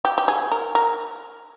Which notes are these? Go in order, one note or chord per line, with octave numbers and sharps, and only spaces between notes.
G4
G4
G#4
A#4
A#4